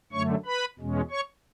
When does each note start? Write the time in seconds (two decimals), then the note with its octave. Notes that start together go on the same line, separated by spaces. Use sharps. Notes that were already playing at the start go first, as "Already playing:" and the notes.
0.12 F#2 D3 A3 C#5 C#6
0.45 B4 B5
0.79 E2 B2 G#3 C#4
1.11 C#5 C#6